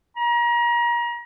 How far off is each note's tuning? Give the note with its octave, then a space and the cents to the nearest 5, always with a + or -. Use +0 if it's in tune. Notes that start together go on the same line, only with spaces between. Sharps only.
A#5 +35